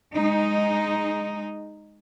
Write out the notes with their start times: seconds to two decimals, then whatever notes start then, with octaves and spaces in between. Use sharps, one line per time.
0.14 G#3 D#4